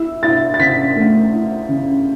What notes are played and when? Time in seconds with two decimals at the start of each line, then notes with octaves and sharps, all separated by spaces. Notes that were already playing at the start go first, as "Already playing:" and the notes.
Already playing: E4 E6
0.23 E4 A6
0.54 A6
0.59 C#3 B6
0.96 A3
1.33 E4
1.69 C#3